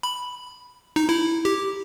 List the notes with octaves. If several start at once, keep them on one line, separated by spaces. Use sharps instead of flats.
B5
D#4
E4
G4